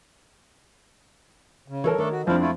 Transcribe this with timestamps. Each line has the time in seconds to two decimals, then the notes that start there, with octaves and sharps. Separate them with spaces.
1.68 C#3
1.84 E3 A4 A#4 C#5 A5
1.98 D#3 A3 D4 A4
2.11 F#4
2.27 F2 F3 C4 D4 E4 C5 F5
2.40 A3 E4 F4